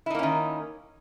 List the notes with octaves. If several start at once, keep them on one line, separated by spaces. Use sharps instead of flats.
D#3 A#3 C#4 D#4 E4